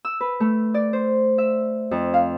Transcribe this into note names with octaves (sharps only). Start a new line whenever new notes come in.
E6
B4
A3
D5
C5
E5
F2
F5